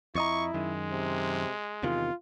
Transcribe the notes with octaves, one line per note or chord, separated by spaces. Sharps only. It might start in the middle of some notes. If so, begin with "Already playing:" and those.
F2 E4 D#5 A#5 C#6
F#2 D#3 G#3
C3
E2 C3 D#3 F4